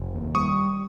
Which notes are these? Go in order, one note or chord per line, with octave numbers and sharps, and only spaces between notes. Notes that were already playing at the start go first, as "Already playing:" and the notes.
Already playing: F1
D#2
G3 C#6 D#6